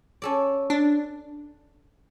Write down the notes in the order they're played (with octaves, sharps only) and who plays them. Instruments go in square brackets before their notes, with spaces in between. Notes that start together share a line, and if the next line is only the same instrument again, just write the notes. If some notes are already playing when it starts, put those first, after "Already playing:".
[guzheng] C#4 A4 D5
[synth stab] D4